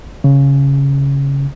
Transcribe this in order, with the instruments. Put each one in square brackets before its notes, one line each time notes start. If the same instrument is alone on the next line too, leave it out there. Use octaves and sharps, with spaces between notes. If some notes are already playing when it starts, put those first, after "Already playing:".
[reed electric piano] C#3